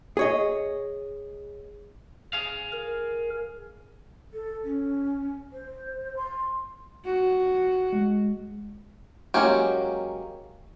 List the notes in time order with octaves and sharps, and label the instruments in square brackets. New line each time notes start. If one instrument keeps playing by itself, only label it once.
[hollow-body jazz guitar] G#4 C#5 D#5
[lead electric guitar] G#4 F5
[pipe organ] A#4
[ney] A4
C#4
C5
C6
[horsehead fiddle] F#4
[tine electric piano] G#3
[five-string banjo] F#3 G#3 A#3 C#4 G4